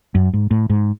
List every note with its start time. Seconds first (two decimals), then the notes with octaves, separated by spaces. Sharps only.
0.15 F#2
0.34 G#2
0.51 A2
0.70 G#2